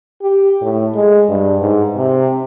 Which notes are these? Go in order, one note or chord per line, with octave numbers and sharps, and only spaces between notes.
G4
A2
G#3
G2
G#2
C3